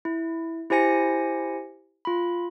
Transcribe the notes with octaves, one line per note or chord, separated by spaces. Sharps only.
E4
E4 G4 C5 G#5 A#6 C#7
F4 B5